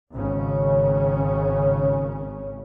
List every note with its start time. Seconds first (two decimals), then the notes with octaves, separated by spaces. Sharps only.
0.12 G#1 C#3 C#4